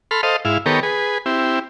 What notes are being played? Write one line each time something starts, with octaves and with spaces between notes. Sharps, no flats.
A4 B5 C6 F6
A4 C5 D#5 F5
G#2 E4 F5
D#3 B3 G4 A4 A#4 C#5
G#4 B4
C4 E4 G4